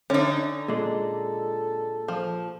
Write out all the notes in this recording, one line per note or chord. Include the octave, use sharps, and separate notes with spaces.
D3 C#4 D#4
A#2 G#3 A4
F3